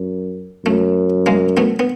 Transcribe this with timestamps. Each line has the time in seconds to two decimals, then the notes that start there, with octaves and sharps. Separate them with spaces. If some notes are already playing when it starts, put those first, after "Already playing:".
Already playing: F#2
0.65 F#2 A3
1.26 G#3 A#3
1.57 A3 B3
1.79 B3